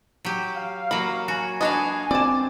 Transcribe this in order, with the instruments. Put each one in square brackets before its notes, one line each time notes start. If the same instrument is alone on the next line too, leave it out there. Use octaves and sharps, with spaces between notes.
[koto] F#3 G4
[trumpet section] F5
[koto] F#3 A#3 [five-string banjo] B5
[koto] F#4 [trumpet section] G#5
[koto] D4 F#4 F5 [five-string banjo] B4 D#5
[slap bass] C4 [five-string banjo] D5 A5